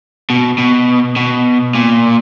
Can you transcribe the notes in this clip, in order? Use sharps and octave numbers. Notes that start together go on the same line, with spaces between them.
B2
B2
B2
A#2